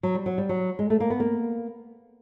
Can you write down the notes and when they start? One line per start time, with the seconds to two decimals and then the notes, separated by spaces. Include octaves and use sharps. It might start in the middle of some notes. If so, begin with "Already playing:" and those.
0.03 F#3
0.15 G3
0.26 F#3
0.38 G3
0.49 F#3
0.79 G#3
0.90 A3
1.00 A#3
1.10 B3
1.20 A#3